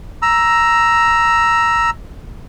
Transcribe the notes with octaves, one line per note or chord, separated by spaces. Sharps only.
A#5 E6